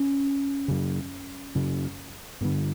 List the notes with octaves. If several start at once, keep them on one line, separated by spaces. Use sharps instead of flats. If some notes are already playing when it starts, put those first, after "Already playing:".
Already playing: C#4
F#2 C#3
F#2 C#3
G2 D3 B3